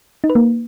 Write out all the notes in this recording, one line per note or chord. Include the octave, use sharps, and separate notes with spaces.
D#4
B4
A#3